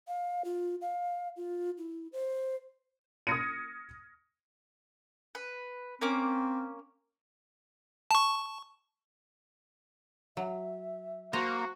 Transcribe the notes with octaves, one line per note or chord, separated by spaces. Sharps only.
F5
F4
F5
F4
E4
C5
D#6 F6 G#6 A#6 C#7 D#7
B4
A#3 C4 C#4 D6
A5 C#6
F#3 E5
A#3 F#4 C5 G#5 A#5